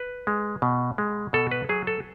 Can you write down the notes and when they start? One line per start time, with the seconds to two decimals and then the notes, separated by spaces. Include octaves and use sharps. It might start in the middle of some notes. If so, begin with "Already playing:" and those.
Already playing: B4
0.27 G#3
0.62 B2
0.98 G#3
1.33 B2 A4
1.51 B4
1.69 F#3 G#4
1.87 A4